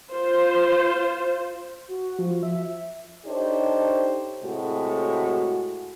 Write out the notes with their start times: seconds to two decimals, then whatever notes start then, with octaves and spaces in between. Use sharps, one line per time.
0.11 F4 C5
1.89 F#4
2.19 F3
2.43 E5
3.26 D4 D#4 G4 A4 C5 C#5
4.43 A2 C3 G#3 F#4